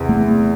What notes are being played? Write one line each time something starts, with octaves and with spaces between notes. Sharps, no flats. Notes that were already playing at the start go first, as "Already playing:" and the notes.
Already playing: E2 C3
A3